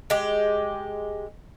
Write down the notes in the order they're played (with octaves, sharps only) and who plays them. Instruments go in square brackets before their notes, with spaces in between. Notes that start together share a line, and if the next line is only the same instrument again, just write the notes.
[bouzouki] G#3 G4